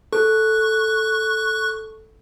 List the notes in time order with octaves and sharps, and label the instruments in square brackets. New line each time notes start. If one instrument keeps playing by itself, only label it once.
[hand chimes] A4 [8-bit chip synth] C#6 F#6